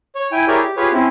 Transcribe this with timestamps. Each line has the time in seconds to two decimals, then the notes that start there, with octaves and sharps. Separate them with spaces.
0.15 C#5
0.32 E4 G5 G#5
0.48 E4 G4 G#4 A#4 C#5 D5
0.60 G4
0.77 F4 G4 G#4 B4 C#5
0.93 C4 C#4 E4